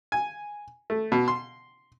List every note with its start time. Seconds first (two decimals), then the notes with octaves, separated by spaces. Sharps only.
0.12 G#5
0.90 A3
1.12 B2
1.28 C6